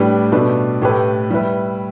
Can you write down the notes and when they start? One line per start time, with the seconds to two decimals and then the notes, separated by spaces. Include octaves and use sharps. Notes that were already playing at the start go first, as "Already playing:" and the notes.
Already playing: A2 G3 D4 G4 B4
0.32 B2 A3 D4 B4
0.82 A2 A3 G4 B4
1.30 G3 E4 B4